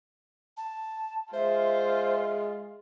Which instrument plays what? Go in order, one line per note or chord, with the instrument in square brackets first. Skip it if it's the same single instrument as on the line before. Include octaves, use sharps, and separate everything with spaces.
[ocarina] A5
[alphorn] G#3 [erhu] F4 [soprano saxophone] C5 [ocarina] E5